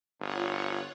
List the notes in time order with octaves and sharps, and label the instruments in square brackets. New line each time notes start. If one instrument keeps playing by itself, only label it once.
[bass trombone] G1 [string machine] F4 C#5 F#5